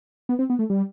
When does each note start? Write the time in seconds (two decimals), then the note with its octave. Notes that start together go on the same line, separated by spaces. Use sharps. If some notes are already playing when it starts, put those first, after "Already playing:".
0.29 B3
0.39 C4
0.50 B3
0.59 A3
0.70 G3